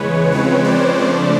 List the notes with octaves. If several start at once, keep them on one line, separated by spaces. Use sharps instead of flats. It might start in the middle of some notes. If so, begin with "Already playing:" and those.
Already playing: E2 C#3 E3 G#3 B4 C#5
C#3 F3 G#3 C4 B4 C#5
C5 D5
C#3 F3 A3 D4